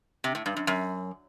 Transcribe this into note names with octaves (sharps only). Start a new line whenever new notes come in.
C3
A2
G2
F#2
F#2